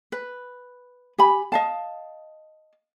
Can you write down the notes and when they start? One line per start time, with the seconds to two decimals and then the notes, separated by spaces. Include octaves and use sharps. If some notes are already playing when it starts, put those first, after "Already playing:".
0.12 B4
1.18 G4 G#5 B5
1.52 D#5 F5 A5